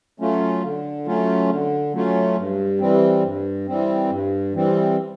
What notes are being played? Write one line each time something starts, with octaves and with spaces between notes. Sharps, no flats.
F#3 A3 C#4 F4
D3
F#3 A3 C#4 F4
D3
F#3 A3 C#4 F4
G2
E3 G3 C4
G2
E3 G3 C4
G2
E3 G3 C4